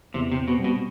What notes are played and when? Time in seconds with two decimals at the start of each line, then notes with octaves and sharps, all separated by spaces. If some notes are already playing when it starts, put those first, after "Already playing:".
0.14 E2 C3
0.32 C3
0.37 C4
0.48 B2
0.59 G3
0.64 B2